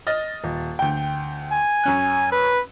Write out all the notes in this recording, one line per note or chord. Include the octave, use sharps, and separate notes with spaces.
D#5 F6 A6
D#1
D2 G5
G#5
F#2 C#4 F#6
B4